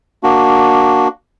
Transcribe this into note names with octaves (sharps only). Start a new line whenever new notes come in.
A#3 D4 F#4